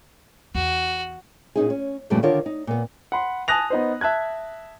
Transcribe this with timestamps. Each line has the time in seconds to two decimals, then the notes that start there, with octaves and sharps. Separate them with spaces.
0.55 E2 F#4
1.56 A#2 C#4 D#4 G#4
1.70 C#4
2.10 G2 A#2 C#3 F3 G3 A3
2.23 D3 D#3 D4 F4 A#4 C#5
2.46 D#4
2.67 A#2 B3
3.12 F#5 B5 C6
3.48 G#5 A5 D#6 F#6 A#6 F7
3.70 B3 D#4 C5
4.01 E5 A5 F#6 G#6